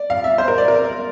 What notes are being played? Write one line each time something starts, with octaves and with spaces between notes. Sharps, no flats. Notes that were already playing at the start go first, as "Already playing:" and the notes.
Already playing: D5
F5
E5
C5
A#4
D5
A#4